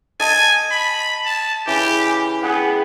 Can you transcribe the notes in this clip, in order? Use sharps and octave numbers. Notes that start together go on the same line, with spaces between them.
D#5 G#5 A5
B5
A5
C#3 E3 G4
B3 G#4 F#5 G5